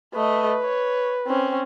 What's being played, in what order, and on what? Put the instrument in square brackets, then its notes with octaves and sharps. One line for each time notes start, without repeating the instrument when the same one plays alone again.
[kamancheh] A3 D#5 [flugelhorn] B4
[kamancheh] C#5
C4 C#4